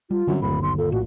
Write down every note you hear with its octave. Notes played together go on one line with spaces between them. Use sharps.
G3 F4
F#2 D3 G3 C4
D1 G1 D#2 D3 B5
B1 C6
A#2 A4
A#1 A2 F#4